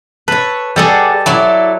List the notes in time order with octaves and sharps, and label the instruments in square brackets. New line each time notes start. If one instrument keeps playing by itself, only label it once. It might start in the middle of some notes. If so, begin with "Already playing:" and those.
[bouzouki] A4 C#5 [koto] B4
[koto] G3 A4 D#5 [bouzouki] G#4 D5 F#5
[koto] F#3 [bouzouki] E4 A4 D5